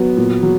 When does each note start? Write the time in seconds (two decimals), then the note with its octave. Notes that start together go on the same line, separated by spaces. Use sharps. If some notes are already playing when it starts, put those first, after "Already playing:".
Already playing: F#3 B3
0.17 A#2
0.43 F#3